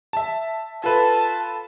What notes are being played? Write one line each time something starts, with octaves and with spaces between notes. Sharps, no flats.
E5 A5
F4 A4 B4 A5